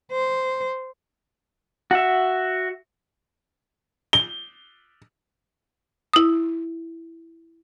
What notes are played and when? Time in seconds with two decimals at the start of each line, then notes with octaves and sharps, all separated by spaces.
0.11 C5
1.91 F#4 E5
4.13 G7
6.13 E4 D#6